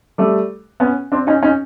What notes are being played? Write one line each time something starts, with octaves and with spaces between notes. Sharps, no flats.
G3 A3
B3 C#4
C4 D4
C#4 D#4
C#4 D#4